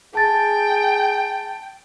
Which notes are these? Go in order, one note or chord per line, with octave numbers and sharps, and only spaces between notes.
G#4 G5 A5 A6